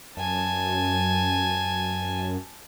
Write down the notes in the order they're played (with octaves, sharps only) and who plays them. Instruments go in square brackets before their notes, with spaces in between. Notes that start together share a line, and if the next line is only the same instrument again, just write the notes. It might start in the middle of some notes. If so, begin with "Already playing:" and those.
[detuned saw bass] F#2 [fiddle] G#5 A5